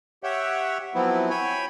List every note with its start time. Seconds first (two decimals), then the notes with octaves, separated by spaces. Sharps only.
0.23 G4 C#5 E5 F#5 G5
0.95 F3 F#3 B3 C4 E4
1.30 C#5 G5 G#5 B5